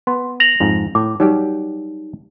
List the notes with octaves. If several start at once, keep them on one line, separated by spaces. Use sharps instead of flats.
B3 C6
A#6 F7 F#7
F2 G#2
A2 D6
F#3 G3 D#4 G4